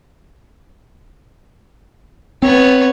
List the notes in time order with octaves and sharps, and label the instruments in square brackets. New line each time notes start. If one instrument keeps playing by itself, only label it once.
[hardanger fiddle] B3 C#5 [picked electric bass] C4